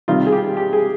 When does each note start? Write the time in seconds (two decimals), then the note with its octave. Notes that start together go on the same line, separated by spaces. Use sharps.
0.08 C3 D#3 G3 F4
0.26 G#4
0.32 G4
0.57 G4
0.73 G#4